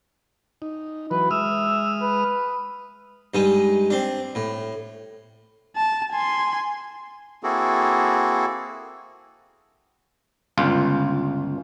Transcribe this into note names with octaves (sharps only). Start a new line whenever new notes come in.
D#4
E3 F#3 B4
G#3 E5 D#6 F6
B4
G2 G#3 D#4
C4 D4
A2
A5
G#5 C6
A#3 C4 E4 F#4 G#4 A4
G1 C#2 F4